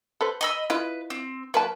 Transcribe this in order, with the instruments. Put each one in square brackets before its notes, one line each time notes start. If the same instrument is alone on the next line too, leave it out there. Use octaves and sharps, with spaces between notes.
[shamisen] A4 B4 C5
[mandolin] D#5 B5 E6
[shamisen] E4 F4 D#5 [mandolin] B4
[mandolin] C4
[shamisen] F#3 A#3 A5 [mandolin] B4